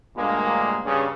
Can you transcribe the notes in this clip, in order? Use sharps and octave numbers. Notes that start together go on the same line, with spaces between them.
D2 G2 A#2 G#3 A#3
G2 C#3